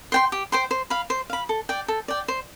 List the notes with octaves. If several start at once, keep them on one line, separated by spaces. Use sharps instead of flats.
C5 G5 C6
G4
C5 G5 C6
C5
F5 B5
C5
F5 B5
A4
D5 G5
A4
D5 G5
C5